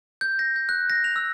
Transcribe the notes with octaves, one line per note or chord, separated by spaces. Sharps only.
G6
A#6
G6
F#6
A#6
F7
E6